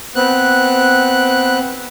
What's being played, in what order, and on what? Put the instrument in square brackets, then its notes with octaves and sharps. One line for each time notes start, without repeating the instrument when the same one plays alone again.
[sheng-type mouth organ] B3 C4 F#6